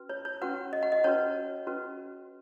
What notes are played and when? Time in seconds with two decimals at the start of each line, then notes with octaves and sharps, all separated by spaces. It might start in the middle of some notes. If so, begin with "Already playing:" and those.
Already playing: C#4 F#4 B4
0.09 C#5
0.25 C#5
0.41 C#4 F#4 B4 F#5
0.73 D#5
0.83 F#5
0.92 D#5
1.04 C#4 F#4 B4 C#5
1.67 C#4 F#4 B4